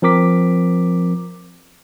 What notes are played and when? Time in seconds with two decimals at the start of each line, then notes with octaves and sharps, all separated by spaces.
0.02 F3 C4 A#4 D6 B6